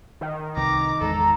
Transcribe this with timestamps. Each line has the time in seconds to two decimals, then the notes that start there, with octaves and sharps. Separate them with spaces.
0.21 D#3
0.57 C2 E3 A#5 D6
1.01 G#1 E2 G#3 A4 A#5